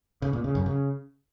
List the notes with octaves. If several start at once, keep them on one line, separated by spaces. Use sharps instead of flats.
C#3
A#2
C#3
F#2
C#3